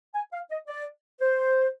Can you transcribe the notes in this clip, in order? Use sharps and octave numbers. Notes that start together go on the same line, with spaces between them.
G#5
F5
D#5
D5
C5